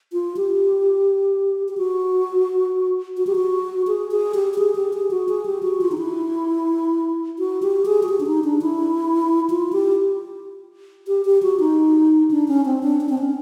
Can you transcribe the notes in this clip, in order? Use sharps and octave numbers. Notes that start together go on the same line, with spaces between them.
F4
G4
G4
F#4
F#4
G4
F#4
G#4
G#4
G4
G4
G#4
G4
G#4
F#4
G#4
G4
F#4
F4
D#4
E4
F#4
G4
G#4
F#4
G4
D4
D#4
D4
E4
F4
G4
G4
G4
F#4
D#4
D4
C#4
C4
D4
D4
C4
C#4